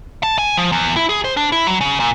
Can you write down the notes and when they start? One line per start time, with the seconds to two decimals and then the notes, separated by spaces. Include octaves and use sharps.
0.23 A5
0.39 G#5
0.57 F3
0.72 E2
0.96 E4
1.09 G#4
1.24 C5
1.37 D4
1.52 E4
1.67 F#3
1.81 C#3
2.00 A#2